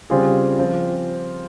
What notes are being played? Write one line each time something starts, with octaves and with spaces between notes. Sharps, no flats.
C#3 G3 C4 F4 G#4
F3 C4 F4